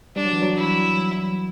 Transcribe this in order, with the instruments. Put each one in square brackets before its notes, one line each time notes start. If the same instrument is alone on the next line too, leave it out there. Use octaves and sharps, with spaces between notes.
[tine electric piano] G3 [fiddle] D4
[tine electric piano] F#3
E3
F#3
[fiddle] E4